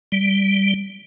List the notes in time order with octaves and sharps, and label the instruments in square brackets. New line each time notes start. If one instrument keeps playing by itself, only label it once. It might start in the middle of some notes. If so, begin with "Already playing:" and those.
[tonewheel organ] G3